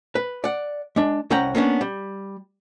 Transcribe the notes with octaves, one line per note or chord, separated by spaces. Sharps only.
B4
D5 F#5
G#3 D4
C2 C#4 F#5 G5 A#5
A#3 B3 C#4 D4
G3